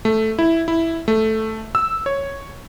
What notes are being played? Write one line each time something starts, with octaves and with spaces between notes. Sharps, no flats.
A3
E4
E4
A3
E6
C#5